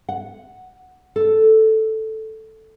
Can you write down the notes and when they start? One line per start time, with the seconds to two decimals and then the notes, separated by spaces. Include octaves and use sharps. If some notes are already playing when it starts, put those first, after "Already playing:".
0.09 F#5
1.16 A4